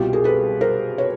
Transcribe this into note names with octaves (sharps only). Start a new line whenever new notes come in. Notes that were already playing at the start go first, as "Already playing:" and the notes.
Already playing: C2 B2 F4 G4
G#4 A#4
A4 B4
A#4 C5
B4 C#5